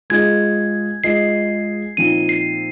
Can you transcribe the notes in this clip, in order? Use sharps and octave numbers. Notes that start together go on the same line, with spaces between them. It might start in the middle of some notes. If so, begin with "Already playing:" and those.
G#3 F4 G#4 D#5 G#6
G#3 F4 G#4 D#5 C7
A#2 F3 C4 D#4 D#7
C7